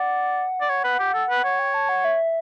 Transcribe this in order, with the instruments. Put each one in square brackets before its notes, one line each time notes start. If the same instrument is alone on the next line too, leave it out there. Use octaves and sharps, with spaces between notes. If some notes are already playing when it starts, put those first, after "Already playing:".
Already playing: [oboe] D5 [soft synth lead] F#5
[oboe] D5
C#5
B4
G4
A4
B4
C#5
[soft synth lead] G5
A5
F#5
E5